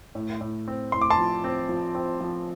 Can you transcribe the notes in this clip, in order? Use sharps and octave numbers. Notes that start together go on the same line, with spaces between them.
A2
A2
C4
A2 C6
D6
A5 C6
F3
C4
F3
C4
F3